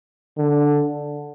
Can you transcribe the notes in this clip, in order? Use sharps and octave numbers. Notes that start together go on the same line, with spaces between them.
D3